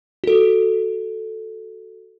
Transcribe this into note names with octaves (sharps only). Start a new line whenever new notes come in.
F#4 A4